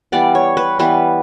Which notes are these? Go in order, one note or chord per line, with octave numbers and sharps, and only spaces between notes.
E3 G3 B3 D5
C#5
B4
E3 G3 B3 B4